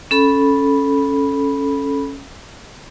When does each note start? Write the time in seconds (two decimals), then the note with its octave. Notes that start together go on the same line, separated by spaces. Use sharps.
0.11 C#4 A4 B5